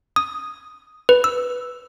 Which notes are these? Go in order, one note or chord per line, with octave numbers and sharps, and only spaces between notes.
D#6
B4
E6